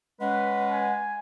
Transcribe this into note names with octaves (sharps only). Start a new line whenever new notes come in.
G#3 C#4 B4 F#5
G#5